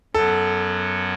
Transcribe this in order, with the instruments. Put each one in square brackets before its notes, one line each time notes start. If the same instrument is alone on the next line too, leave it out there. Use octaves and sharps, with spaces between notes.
[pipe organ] F#2 F#3 B3 [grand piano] A4